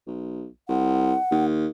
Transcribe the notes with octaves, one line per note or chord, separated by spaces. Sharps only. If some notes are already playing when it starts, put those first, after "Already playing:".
B1
C2 F#5
D#2